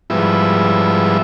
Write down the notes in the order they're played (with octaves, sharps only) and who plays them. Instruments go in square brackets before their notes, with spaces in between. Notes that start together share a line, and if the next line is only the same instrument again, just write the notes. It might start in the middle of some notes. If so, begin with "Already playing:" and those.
[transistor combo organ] G#2 F3 G3 B3 E4 E5